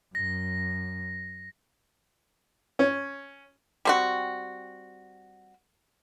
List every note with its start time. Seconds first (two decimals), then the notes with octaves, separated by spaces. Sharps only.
0.15 F#2 A#6
2.79 C#4
3.85 G3 C4 F#4